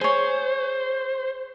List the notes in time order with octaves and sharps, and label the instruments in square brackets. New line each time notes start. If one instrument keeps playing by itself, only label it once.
[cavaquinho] G#4 C#5 [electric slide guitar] C5